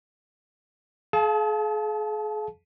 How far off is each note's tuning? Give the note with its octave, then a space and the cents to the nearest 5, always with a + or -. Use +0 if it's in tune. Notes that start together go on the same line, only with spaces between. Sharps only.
G#4 +40 F5 +0 A5 -25